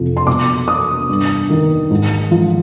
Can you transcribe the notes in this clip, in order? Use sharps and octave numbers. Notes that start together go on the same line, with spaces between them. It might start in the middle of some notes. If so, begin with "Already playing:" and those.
Already playing: F2 C3 F3
C6
B2 D6
D#6
G2
D#3
G#2
F3